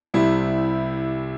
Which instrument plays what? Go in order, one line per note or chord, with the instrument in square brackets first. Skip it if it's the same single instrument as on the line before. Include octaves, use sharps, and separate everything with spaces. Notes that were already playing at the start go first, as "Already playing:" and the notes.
[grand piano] C2 C3 G3 E4